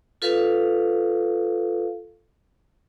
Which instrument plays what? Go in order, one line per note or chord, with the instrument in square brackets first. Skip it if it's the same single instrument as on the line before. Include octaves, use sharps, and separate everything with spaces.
[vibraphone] F4 A4 B4 F5